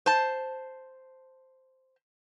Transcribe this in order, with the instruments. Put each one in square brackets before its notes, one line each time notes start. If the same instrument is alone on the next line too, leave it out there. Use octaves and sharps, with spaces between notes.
[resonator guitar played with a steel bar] C5 A5